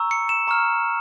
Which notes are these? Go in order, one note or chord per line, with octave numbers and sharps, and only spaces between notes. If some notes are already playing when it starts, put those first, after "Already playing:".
Already playing: A#5 C#6 E6
C#7
E7
A#5 C#6 F6